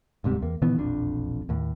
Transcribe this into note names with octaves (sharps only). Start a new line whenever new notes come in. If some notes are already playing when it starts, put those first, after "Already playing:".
D1 G#2 C3 G3
E2 A#3
A#2 D#3 E3 B3
E1 A#1 F2 D4
D#2 A2